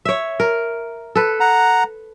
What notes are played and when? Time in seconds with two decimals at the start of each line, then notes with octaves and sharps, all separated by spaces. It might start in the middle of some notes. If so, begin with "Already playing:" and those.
0.05 C#5 E5
0.40 A#4
1.15 A4 B4
1.40 F#5 A#5